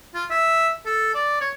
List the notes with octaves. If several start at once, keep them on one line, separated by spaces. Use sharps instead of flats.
F4
E5
A4
D5
C#5